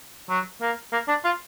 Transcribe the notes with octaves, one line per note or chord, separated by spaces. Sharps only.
F#3
A#3
A#3
D4
F4